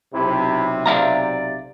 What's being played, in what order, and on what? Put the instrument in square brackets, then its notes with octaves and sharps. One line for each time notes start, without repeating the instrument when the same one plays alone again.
[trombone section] B1 C3 [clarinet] E4
[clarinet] D5 [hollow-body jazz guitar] E5 F5 A#5